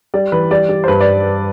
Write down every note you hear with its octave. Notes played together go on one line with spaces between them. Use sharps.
G3 D5
E3 B4
G3 D5
G3
C5
G2 B4
D5